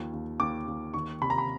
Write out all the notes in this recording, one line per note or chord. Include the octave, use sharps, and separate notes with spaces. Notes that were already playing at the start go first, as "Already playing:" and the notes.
Already playing: D#2 F3
D#2
D#2 D6
D#2
D#3 C#6
C3 B5
A#5
B5